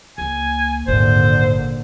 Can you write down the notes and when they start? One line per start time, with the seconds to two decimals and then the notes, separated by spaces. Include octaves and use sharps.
0.18 C#2 A#3 G#5
0.87 G#1 D#2 A#2 D3 C5